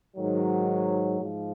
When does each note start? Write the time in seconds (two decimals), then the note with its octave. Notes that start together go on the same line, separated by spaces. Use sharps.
0.17 G#2 D#3 F#3
1.21 G#2 F3